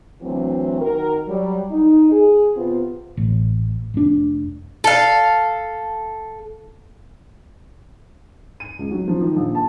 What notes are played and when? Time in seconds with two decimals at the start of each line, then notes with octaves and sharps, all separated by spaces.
0.21 D2 E3 F#3 C4
0.80 D#3 F#4 A#4
1.28 F#3 G3
1.71 D#4
2.11 G#4
2.55 C3 B3 C4 F4
3.17 A1
3.94 F1 D4
4.84 A4 F5
8.60 D#7
8.79 C#2
8.91 F#3
9.08 F3
9.21 D#3
9.36 A#1
9.55 A5